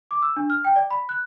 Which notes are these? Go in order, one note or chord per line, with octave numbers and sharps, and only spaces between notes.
D6
E6
D4
F6
G5
D5
B5
F#6